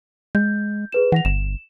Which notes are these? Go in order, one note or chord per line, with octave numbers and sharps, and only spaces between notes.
G#3 G6
G#4 B4 E7
E3 F#5 A#6 F7
G1 E7